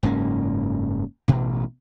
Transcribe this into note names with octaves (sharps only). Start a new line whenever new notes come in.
F#1 G#2 A#3 C#4
A1 B2